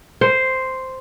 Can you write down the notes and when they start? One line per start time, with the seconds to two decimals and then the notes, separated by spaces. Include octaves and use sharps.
0.21 C5